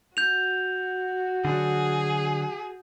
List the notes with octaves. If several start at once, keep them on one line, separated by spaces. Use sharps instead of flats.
F#4 G6 F7
D3 F#3 D4 G#4